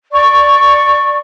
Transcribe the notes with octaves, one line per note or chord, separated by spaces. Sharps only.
D5 C#6